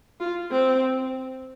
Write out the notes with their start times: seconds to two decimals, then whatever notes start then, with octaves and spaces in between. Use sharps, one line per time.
0.20 F4
0.51 C4